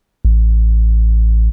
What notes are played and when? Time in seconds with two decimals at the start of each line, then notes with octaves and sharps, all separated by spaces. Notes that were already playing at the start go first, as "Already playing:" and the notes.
0.25 A1